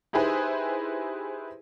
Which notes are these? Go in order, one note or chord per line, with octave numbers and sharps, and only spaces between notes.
D#4 E4 G4 G#4 B4 C5